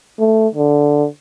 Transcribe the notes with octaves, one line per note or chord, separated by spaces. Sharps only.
A3
D3